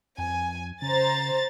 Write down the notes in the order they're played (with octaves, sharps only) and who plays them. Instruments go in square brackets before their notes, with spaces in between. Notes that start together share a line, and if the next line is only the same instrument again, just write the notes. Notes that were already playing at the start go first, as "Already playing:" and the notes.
[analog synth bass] F2 [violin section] G#5
[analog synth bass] C#3 [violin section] C5 A#5 A6